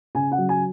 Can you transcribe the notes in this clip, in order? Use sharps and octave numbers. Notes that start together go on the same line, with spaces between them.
C#3 G#5
F#5
F#3
G#5